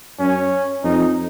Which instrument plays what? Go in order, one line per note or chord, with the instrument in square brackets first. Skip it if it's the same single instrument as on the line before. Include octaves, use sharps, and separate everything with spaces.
[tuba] F#2 [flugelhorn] C#4
[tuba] F2 [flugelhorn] D#4